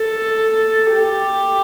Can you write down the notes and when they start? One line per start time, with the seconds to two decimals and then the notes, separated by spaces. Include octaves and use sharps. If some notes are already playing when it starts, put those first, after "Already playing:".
Already playing: A4
0.93 G4